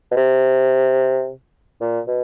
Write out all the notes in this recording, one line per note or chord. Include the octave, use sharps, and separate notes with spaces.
B2
C3
A#2
B2